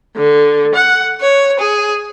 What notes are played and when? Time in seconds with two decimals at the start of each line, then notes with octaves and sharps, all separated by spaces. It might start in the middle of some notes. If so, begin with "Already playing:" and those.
0.16 D3
0.75 F#5
1.21 C#5
1.60 G#4